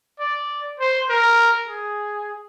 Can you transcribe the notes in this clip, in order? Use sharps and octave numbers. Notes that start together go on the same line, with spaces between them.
D5
C5
A#4
G#4